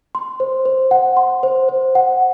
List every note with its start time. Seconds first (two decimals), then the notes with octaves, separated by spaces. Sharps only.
0.15 C6
0.40 C5
0.65 C5
0.91 F#5
1.17 C6
1.43 C5
1.69 C5
1.95 F#5